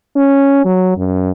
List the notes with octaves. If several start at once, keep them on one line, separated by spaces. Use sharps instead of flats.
C#4
F#3
F#2